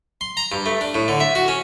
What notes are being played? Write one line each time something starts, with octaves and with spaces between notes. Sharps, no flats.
C6
A#5
G2
A3
D4
A2
D3
E5
F#4
C#4